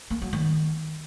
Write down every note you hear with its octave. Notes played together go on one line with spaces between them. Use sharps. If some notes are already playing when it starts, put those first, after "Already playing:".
A#3
F#3
D#3